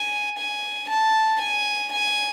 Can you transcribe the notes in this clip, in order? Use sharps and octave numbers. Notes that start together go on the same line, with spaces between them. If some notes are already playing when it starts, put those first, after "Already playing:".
Already playing: G#5
G#5
A5
G#5
G#5